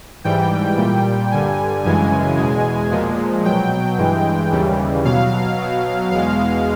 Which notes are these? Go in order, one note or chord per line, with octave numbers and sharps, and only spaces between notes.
G#2 E3 G3 G5
A#2 G3 G5
G2 D3 G3 G#5
F#2 C#3 E3 G#3 G#5
E2 B2 G#3
A#2 F3 G#3
B2 F#3 G5
G2 E3 G#3
D#2 C#3 E3 G3
B2 F#3 F5
B2 F#3
E2 B2 G#3 F5